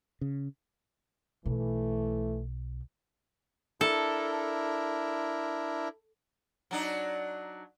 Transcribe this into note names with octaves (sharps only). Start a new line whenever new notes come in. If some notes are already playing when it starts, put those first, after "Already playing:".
C#3
B1 E3 A3
D4 E4 A4 A#4
F#3 D4 D#4